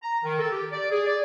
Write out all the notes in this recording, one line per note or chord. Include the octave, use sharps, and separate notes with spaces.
A#5
D#3
A4
G4
D5
G#4
D5